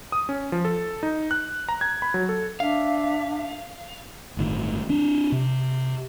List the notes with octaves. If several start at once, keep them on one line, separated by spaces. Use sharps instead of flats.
D#6
C#4
F3
A4
D#4
F#6
A#5
G#6
B5
F#3
A4
D4 E5 F5
G1 A2 D#3
C4 D4
C3